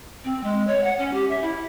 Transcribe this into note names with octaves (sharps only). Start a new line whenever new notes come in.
C4
G#3
C#5
F#5
C#4
G4
E5
E4